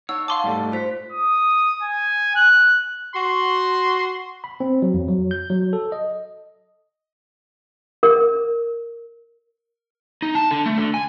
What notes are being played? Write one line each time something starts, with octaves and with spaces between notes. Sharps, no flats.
D#4 C#5 F#5 E6
F5 A5 C6 D6
G#2 G3 A3
F4 C5 B6
D#6
G#5
F#6
F#4 C6
B5
C4
F#3
F2
F#3
G6
F#3
A4
D#5
A#4
D#4
A5
D3
A3
D3
G#5